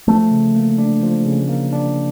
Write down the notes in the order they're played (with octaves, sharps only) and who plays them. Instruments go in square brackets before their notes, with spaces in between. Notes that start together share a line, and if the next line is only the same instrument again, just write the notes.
[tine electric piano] F3 [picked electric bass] A3
[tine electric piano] C#3
A#3
D4
F3
C#3
A#3
D4